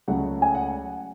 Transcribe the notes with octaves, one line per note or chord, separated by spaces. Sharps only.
C#2 C#3 F#3 A3 F#5
G#5
F#5